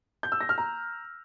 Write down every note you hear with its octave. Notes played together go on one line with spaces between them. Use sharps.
G6
E6
A#6
F6
A#5